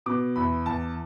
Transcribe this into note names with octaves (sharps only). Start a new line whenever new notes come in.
B2 D6
E2 B5
E2 A5